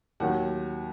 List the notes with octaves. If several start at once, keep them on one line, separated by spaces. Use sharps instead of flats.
D#2 D#3 F#3 F#5